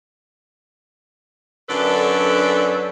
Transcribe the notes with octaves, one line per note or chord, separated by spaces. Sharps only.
F#2 D3 D4 A4 B4 D5